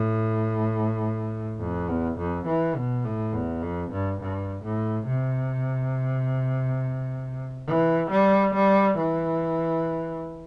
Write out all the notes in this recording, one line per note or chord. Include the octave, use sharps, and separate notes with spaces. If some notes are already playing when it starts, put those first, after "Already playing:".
Already playing: A2
F2
E2
F2
E3
B2
A2
E2
F2
G2
G2
A2
C3
E3
G3
G3
E3